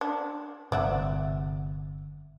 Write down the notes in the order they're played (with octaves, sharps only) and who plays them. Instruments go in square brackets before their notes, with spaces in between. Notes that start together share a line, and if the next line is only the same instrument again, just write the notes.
[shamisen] D4
[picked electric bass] G1 C3 [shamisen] D5 E5 F#5